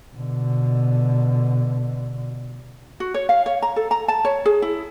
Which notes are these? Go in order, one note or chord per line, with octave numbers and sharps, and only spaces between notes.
B2 D3
F#4
C#5
F5
C#5
A#5
A4
A#5
A5
C#5
G#4
E4